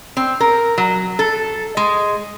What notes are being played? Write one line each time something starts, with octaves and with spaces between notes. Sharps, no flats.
C4
A#4
F#3
A4
G#3